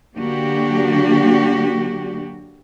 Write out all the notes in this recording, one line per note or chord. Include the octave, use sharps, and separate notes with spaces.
D3 F#3 A#3 D4 F#4 G4